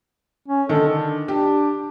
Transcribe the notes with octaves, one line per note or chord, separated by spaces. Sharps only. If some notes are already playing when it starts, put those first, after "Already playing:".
C#4
D3 D#3 A4
D4
D4 G4